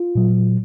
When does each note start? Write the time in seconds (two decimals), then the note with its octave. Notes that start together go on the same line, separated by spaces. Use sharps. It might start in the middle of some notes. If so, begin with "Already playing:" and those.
Already playing: F4
0.15 A#2 F#3